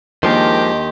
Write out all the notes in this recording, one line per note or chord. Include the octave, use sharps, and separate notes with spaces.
D#2 D#3 F3 G#3 D4 G4 D#5 C6